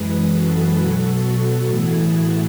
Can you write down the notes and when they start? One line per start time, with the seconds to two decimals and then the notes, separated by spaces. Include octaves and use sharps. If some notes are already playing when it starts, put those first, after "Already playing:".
Already playing: F#2 E3 G#3 G#4 B4
0.30 F#4 A4
0.75 B2 F#3 B3 F#4 A4
1.21 F#4 A4
1.66 A2 E3 A3 E4 G#4
2.12 F#4